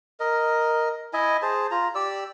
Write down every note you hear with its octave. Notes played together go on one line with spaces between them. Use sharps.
A#4 D#5
E4 D#5 E5 G#5
G#4 C5 A5
F4 A#5
G4 D5 E6